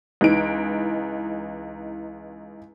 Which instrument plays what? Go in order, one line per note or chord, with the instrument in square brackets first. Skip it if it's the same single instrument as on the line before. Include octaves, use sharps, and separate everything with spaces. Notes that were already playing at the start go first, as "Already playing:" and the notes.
[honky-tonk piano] C#2 E3 D#4 D7